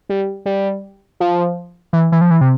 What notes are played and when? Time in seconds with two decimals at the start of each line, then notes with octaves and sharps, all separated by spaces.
0.09 G3
0.46 G3
1.20 F3
1.93 E3
2.12 E3
2.21 F3
2.31 E3
2.41 C3